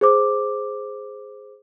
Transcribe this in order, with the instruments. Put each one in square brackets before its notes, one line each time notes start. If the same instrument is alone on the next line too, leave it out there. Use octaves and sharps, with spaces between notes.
[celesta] G#4 C5 D6